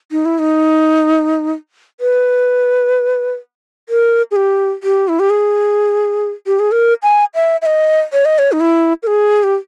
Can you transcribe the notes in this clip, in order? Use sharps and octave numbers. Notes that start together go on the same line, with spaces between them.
D#4
E4
D#4
B4
A#4
G#4
G4
G4
E4
G4
G#4
G4
G#4
A#4
G#5
E5
E5
D#5
C#5
D#5
C#5
D#4
E4
A#4
G#4
G4